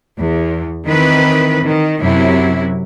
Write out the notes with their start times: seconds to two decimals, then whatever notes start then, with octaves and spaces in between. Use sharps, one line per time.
0.18 E2
0.86 D#3 E3 C4 B4
1.63 D#3
2.00 F#2 C3 F#3 E4